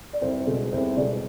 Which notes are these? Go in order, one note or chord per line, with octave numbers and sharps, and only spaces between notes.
D5
C2 C5
B2 G#3
C2 C5
B2 G#3 D5